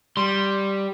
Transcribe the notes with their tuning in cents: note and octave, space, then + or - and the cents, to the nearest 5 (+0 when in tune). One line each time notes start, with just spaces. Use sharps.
G3 +0 C6 +0